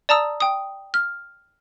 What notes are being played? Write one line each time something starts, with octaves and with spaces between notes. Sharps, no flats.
D5 A5 A#5 D#6 E6
G5 D#6
F6